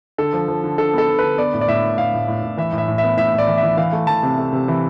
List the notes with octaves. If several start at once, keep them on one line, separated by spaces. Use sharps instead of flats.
D3 A4
F3
F3
D3
D3 A4
B3 A4
B3
D3 B4
B3 D5
A2
D5
A2 E5
B3
A2 F5
A2
A2
A2
E3 E5
A2
E5
A2
E5
B3
A2 E5
A2
D5
E3
E5
E3
E3 F5
A3
E3 A5
C3
A3
C3
E3